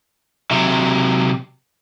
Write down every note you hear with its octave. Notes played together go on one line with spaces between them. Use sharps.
C3 F#3